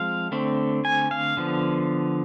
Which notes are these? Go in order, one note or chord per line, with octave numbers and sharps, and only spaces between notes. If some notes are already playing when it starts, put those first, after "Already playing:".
Already playing: F3 G#3 C4 F5
D3 A3 C4
G#5
F5
D3 F3 B3